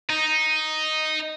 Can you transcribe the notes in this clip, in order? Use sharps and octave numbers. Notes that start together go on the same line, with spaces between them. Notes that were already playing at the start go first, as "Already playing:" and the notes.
D#4